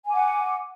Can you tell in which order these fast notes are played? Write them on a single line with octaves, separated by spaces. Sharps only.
G#5 D6 F#5